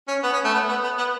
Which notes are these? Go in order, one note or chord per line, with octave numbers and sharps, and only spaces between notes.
C#4
B3
C#4
A3
B3
B3
B3
B3